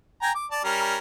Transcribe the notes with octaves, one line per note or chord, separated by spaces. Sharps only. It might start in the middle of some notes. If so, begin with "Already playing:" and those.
G5 G#5 A#5
D6
D5 A5
G3 C#4 A#4